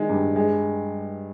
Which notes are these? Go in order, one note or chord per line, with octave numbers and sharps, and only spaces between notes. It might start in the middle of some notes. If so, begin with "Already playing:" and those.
Already playing: D#3 G#3
G2
G#3